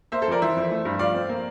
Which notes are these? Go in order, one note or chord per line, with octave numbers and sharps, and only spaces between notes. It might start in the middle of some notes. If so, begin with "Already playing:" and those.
A#3 C5 E5
A4 C5
F2 A#4 D5
E3 C5 E5
F2
A3
G2
F3 D5 F5
C4
A#3